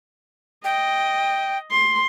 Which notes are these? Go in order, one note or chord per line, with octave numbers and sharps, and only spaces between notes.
D#5 G5
C6